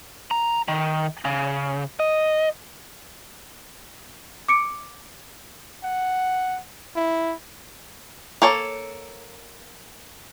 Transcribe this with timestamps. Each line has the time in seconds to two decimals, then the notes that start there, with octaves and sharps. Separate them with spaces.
0.31 A#5
0.68 D#3
1.25 C#3
2.00 D#5
4.48 D6 C#7 D7
5.84 F#5
6.96 E4
8.42 A#3 A4 C#5